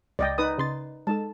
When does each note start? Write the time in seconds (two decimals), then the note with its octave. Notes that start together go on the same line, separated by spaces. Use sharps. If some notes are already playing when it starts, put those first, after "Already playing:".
0.19 C#2 D5 D#5 G5
0.38 D#4 B4 D#6
0.58 C#3 C6 A6
1.07 G#3 D#4 A4 A5